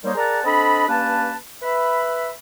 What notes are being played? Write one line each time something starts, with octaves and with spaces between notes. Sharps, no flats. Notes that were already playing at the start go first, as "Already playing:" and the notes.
D#3 G3 A#3 D#4 C5 C#5
G#4 A#4 D5 F#5 A5 A#5
C4 D4 A4 D#5 B5
G2 A#3 C#4 B4 A5
B4 E5 B5